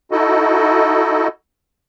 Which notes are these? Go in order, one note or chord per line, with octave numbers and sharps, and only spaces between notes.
D#4 E4 F#4 A4 D#5